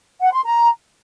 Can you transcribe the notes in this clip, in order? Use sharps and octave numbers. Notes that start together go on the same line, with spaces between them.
F#5
C6
A#5